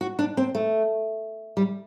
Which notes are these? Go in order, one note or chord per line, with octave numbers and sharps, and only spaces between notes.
F#4
D4
C4
A3
G3